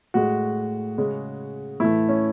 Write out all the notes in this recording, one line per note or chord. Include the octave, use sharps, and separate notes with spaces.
A2 G#3 F#4
C#3 G#3
A2 E3 A3 E4
C#4